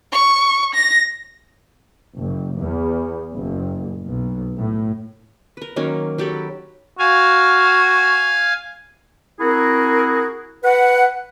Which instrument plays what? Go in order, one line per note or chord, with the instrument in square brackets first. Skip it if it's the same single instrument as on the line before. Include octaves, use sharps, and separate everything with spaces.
[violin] C#6
A#6
[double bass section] F#1
E2
F#1
B1
A2
[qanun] A#4 B4
D#3 F#3 A#3 C#4
F#3 G4 A4 B5
[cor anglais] F#4 [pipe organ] F5 G#5
[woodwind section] C4 E4 F#4 G#4 A#4
B4 F#5